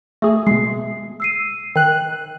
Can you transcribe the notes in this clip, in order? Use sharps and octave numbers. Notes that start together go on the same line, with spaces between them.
A3 G#4 E5
B2 G#3 C7
E6 C7 D#7
D#3 G5 F#6